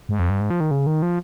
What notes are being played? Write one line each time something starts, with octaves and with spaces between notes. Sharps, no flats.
G#2
F2
G2
G#2
F3
D#3
C#3
D#3
F3